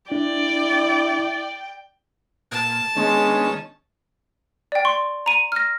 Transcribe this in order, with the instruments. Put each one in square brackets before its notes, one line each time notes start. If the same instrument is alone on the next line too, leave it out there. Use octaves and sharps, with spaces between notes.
[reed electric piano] D4 [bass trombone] E4 [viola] D5 [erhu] G5
[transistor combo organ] A#2 [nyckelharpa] A5
[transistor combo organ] D#3 C#4 [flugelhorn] G#3 [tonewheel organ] B3 D4
[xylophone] D5 G5
C6 C#6
A#5 D#7
F6 A#6